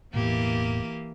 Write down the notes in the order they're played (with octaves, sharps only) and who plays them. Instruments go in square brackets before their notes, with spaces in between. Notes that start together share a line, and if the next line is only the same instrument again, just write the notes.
[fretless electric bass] E1 A2 B3 [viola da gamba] E3 A#3 G4